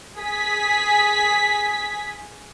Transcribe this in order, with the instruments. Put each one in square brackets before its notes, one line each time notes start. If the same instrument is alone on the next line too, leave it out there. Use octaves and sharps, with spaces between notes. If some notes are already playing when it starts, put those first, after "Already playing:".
[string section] G#4 B6